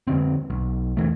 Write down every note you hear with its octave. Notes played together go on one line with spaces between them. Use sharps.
F2 D3 C4
B1
E2 E3 A3